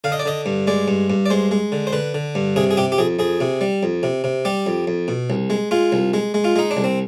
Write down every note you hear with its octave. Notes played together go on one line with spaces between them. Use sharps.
D3 F5
D#5
D5
D3 D#5
G2
G#3 D5
G2
G2
D5
G#3 C5
G#3
D3
C5
D3 B4
D3
G2
C3 G#4
G#4
C3 G4
G4
F2 G#4
F2 G#4
C3
G3
F2
C3
C3
G3 G4
F2
F2
B2
C2
G#3
G#3 F4
C2
G#3
G#3
F4
G#3 D#4
D4
C2
C4